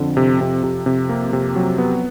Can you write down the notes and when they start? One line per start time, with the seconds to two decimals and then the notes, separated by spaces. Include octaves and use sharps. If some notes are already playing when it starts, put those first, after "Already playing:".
Already playing: F2 D3
0.17 C3
0.41 C3
0.64 C3
0.86 F2 C3
1.09 A#3
1.33 C3
1.56 F#3
1.78 B3